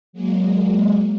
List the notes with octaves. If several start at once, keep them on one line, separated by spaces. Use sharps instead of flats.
F#3 G#3 A#3